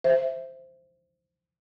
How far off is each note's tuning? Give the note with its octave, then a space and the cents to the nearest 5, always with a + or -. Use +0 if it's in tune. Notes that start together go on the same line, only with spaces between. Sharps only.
C5 +0 E5 +0